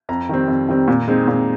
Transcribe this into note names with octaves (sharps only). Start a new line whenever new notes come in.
F2 A#5
D#3 G3 C4
F2
D#3 G3 C4
A#2
G#3 C4 D#4
A#2